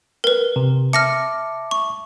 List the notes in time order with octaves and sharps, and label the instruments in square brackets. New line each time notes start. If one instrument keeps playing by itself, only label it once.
[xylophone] A#4 B4
[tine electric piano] C3
[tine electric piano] E5 A5 D6 [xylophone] F6 A#6 C#7
[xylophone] C#6